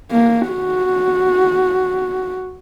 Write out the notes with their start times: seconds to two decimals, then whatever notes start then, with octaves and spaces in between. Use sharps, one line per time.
0.12 A#3
0.50 F#4